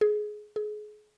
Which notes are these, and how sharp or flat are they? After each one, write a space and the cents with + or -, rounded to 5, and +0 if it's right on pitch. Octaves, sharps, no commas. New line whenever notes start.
G#4 +20
G#4 +30